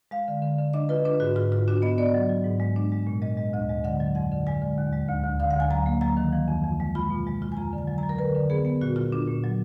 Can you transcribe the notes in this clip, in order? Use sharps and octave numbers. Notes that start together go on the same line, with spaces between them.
G#3 F5
D3
D3
D3
D4 D#5
F4 B4
D4 B4
G#2 F#4
G#2 F4
G#2 F4
D4 F#4
B3 D#5
B3 D5
F#3
F#3
G#2
G#3
D4
G#3
A#2
G#3 D#5
G#3
D2 D#5
G#3
D3 F#5
F#3
F2 F#5
D3
G#3 G#5
D3
D#2
G#3
D2
D2
D3 F5
F#5
D2 G#5
F#3 A#5
A#3
F#3 A#5
D#3
F3
F2
F2
G#3
F4 B5
B2
G#3
F4
G#5
F2 A#5
D3
G#5
F#3
F#3 A#5
A#4
D3 B4
D3
B3 G#4
B3
A#2 F#4
F4
D4
A#2
F#3